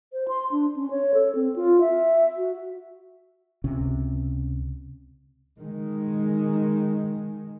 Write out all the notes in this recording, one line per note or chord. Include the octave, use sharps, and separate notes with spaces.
C5
C6
D4
C#4
C#5
A4
C4
F4
E5
F#4
C#2 C3 C#4
D#3 G#3